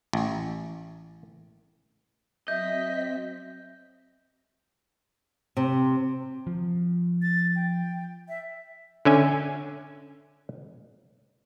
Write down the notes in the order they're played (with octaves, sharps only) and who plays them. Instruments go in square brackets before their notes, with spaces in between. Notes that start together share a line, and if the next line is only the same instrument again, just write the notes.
[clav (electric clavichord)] A1
[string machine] F#3 C4 B6 [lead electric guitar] D#5 [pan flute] E5 [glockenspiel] G6
[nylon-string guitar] C3
[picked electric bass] F3
[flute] A6
G5
E5
[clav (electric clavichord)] D3 C#4 E5 G#5